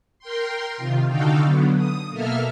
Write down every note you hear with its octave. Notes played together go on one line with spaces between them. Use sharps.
A#4 G5 C6
C3 D#3 F4
D3 D#4 F#4 A4 F5 G5
D3 F#3 B3
D#6
B2 A#3 A4 E5 F6